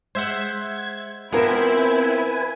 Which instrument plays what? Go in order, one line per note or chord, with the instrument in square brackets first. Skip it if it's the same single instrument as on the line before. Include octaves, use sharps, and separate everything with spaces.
[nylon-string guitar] G#3 [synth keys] C5 E5 F#5 [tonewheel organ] G#6
[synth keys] F3 E5 [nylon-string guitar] B3 A#4 [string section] C4 E4 [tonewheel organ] B4 G#5